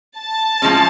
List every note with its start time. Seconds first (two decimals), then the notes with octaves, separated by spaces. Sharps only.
0.17 A5
0.62 A2 F3 G#3 C#4